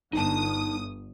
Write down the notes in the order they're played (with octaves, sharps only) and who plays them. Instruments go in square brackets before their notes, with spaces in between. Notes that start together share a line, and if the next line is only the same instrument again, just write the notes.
[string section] G1 D#6 [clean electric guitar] D#4 A5